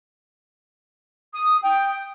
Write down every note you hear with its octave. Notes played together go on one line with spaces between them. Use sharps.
D#6
G5